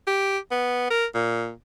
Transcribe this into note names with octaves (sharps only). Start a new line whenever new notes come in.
G4
B3
A#4
A#2